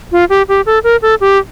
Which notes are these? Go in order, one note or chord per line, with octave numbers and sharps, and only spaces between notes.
F4
G4
G4
A4
A#4
A4
G4